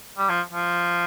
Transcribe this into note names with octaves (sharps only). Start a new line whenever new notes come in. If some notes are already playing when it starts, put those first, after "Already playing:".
G3
F3
F3